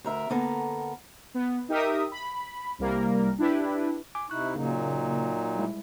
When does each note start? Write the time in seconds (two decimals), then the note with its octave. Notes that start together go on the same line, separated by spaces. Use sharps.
0.04 D2 A#4 E5
0.30 D3 A#3 B3 A4 A#4
1.34 B3
1.69 D#4 G4 A#4 E5 D#6
2.12 B5
2.79 C2 C3 G3 A#3 A#4
3.38 D4 E4 G4 B4
4.15 G#5 D6
4.30 C3 D#4 E4 C#6 F#6
4.56 A#2 C#3 F#3 A#3 D#4
5.56 G3 G#3 E4